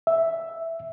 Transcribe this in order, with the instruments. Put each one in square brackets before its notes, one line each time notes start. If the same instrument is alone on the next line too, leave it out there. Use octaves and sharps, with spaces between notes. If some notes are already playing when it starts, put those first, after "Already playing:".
[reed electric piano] E5